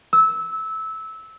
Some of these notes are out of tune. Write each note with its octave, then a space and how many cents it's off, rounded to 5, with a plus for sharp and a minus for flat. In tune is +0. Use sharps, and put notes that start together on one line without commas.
E6 -15